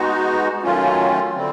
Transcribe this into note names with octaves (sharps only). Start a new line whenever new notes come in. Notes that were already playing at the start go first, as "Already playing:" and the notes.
Already playing: G#3 B3 D#4 F#4
D#3 F#3 A3 C#4 F4
D3 G3 C4